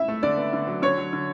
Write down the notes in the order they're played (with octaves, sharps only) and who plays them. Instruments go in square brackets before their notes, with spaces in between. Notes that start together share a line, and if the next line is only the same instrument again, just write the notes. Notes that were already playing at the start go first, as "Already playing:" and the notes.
Already playing: [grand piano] E4 [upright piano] E5
[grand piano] A3
[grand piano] D3 [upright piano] D5
[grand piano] B3
D3
F#3
[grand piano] D3 [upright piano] C#5
[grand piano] F#3
D3